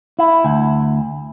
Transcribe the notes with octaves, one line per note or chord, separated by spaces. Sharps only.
E4
D2